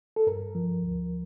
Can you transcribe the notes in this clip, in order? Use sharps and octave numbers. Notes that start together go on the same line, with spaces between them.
A4
G2 A#4
F3
D2